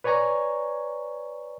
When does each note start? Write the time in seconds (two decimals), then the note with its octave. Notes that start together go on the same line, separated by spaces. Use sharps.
0.04 B4 C#5 D5 G#5 A#5 C#6